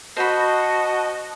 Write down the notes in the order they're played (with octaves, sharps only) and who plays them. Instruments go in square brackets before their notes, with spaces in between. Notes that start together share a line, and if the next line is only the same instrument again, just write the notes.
[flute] F#4 [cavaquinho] C5 B5 [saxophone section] D#5 [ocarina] A5